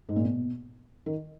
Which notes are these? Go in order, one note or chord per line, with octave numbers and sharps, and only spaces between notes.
G#2
A#2
B2
D#3